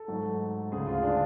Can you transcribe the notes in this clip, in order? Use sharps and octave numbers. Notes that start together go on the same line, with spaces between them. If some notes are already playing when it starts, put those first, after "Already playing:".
Already playing: A4
G#2 F#3 A3
D2 C#3 G#3 G#4
F4
D4